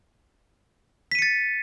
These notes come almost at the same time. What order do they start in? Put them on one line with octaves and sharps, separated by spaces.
B6 D#7 C#7 A6